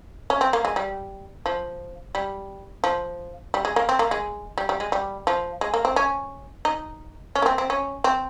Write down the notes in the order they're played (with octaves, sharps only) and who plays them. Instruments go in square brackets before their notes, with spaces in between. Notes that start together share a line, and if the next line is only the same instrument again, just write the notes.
[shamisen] C#4
C4
A#3
G#3
G3
F3
G3
F3
G3
G#3
A#3
C4
A#3
G#3
G3
G3
G#3
G3
F3
G#3
A#3
C4
C#4
D#4
C#4
A#3
C4
C4
C#4
C4